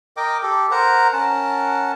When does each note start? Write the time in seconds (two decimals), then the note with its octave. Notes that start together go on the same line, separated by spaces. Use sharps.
0.17 A#4 D#5 G5 D6
0.43 G4 A4
0.71 A#4 C5 F#5 A#5
1.13 C#4 A#4 F#5 A5